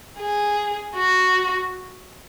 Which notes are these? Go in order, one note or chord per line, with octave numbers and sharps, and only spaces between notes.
G#4
F#4